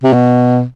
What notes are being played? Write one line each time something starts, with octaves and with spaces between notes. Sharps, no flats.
C3
B2